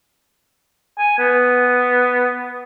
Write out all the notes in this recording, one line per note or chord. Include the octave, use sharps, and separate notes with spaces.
G#5
B3